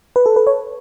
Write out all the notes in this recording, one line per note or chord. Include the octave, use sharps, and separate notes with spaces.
B4
A4
B4
C#5